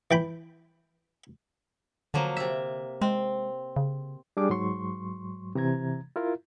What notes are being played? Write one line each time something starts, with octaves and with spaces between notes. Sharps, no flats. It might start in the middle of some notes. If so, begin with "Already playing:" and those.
E3 G5 B5
D3 F3 F#3 A#3
C3 E5
G#3 C4
C#3
G3 D4 G#4 D6
G#2 F#3 C6 C#6
C3 E3 A#5 G#6
E4 F4 A#4